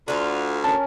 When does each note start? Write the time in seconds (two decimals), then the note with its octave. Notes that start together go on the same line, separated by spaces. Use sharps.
0.08 D2 D3 F4
0.64 C#4 A#4 A5